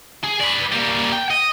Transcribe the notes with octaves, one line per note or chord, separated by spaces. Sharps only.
G#4
B4 D5
G3 A#3
G5
D#5